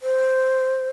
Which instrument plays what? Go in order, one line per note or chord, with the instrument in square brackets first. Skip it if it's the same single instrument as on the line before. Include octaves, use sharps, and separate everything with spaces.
[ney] C5